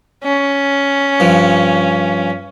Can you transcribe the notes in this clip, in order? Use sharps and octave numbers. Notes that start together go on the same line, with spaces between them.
C#4
G2 F3